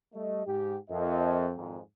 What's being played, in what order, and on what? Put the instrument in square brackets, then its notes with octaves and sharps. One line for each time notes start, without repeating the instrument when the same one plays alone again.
[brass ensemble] G3 A3 D#5
G#2 G4
[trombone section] F2 [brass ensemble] A#4 D#5 E5
[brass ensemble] G#1 F2 G#2